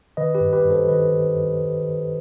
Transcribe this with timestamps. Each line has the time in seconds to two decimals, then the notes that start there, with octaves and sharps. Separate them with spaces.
0.17 D#3 B4 D#5
0.35 G4 B4
0.41 G2
0.53 G4 B4
0.65 G2
0.70 A4 C5
0.88 D#3 B4 D#5
1.12 D#3
1.35 G2
1.59 G2
1.82 D#3